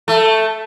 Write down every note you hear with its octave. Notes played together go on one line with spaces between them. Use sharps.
A3